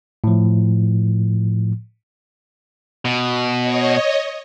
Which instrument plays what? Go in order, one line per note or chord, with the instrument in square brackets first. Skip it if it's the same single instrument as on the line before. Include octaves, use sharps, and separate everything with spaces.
[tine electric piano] A2 F3
[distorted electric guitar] B2
[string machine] C#5 D#5